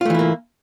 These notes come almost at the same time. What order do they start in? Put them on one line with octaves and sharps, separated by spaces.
F4 A3 E3 E4 A#3